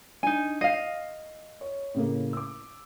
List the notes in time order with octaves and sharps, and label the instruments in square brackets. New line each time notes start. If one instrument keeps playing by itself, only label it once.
[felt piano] D4 [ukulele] D#4 G#5
[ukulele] D#5 F5 [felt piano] C7
[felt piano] C#5
A2 C#3 A#3
D6 E6